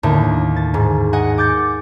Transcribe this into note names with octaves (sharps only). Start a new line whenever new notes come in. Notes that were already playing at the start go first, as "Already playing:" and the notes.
D#2 A2 D3
A6
G#2
D#5 F#5 G#5
D6 G6 A6 C#7